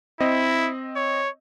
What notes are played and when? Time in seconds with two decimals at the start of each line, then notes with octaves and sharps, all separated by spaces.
0.20 C4 E4 D#5
0.96 C#5